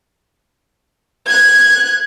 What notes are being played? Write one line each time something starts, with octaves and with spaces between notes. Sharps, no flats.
F#6 G#6